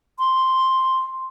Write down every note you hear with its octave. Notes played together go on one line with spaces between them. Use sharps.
C6